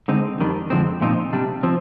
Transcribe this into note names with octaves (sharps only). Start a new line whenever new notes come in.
D3 G#3 C4 D#4
F2 D#3 G3 D4
F2 D3 F3 G#3 C4
A#2 F3 C4 D#4
C3 G3 D4
F3 C4